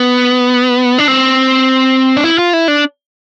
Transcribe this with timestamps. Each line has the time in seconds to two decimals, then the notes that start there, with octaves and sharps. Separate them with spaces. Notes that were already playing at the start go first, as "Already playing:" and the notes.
Already playing: B3
0.98 D4
1.08 C4
2.17 D4
2.24 E4
2.38 F4
2.53 E4
2.68 D4